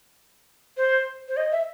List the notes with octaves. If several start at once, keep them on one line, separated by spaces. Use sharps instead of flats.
C5
C5
D#5
E5